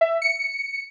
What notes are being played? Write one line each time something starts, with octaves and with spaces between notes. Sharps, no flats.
E5
C#7